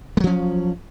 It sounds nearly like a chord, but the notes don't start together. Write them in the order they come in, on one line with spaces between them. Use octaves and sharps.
G#3 F#3 F3 C#4